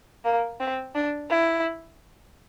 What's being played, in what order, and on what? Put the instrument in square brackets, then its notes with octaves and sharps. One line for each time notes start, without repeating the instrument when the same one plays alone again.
[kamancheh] A#3
C4
D4
E4